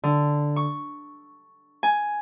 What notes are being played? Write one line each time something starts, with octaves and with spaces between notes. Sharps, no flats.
D3
C#6
G#5